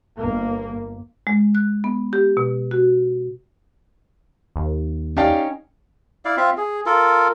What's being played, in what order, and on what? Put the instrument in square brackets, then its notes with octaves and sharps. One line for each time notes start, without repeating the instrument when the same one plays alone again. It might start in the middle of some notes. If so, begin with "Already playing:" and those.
[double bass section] G1 A#3
[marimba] G#3
F#6
B3
G4
B2
F#4
[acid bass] D#2
[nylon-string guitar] C#4 D#4 G5 [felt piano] G4 D5 F5
[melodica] E4 D5 F5
C4 F4 E5 F5
G#4
F4 A4 A#4